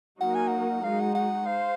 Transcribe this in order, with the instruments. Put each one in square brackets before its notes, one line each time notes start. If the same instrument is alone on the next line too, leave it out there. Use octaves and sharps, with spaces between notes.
[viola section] F#3 A#3 D#4 F#4 A#4 [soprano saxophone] F#5
[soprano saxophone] G#5
F#5
[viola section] G#3 D#4 F#4 [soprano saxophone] F5
[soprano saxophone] F#5
F#5
[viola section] C5 [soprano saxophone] F5